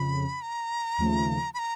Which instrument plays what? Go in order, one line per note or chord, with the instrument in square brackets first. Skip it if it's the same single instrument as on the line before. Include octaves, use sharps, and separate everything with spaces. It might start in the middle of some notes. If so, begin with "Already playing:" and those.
Already playing: [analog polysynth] F2 C#3 [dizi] B5
[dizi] A#5
[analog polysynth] D#2 C#3 F3 A3
[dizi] B5
A#5